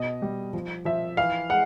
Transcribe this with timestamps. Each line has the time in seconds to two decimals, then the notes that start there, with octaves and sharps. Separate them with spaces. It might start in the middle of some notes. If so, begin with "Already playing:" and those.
Already playing: B2 D#5
0.22 G3
0.53 F3
0.85 F3 E5
1.17 E3 F5
1.50 G#3 F#5